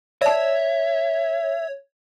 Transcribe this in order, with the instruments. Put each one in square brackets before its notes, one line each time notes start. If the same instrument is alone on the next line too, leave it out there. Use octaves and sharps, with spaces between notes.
[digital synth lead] C#5 [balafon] D5 A5 [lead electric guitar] E5